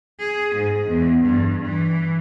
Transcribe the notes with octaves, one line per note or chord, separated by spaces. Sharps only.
G#4
G#2
E2
G2
E3